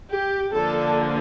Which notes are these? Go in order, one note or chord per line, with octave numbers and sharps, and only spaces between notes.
G4
D3 F3 A#3 A4